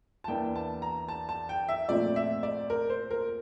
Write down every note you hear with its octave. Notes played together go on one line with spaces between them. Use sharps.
A5
E2 E3 A#3 D4 G5
A5
A#5
A5
A5
G5
E5
A#2 F3 A3 C4 D5
E5
D5
A#4
C5
A#4